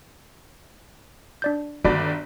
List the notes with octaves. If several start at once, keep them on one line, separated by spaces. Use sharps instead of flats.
D4 D5 G6
G1 D#3 A#3 F#4 D5 B5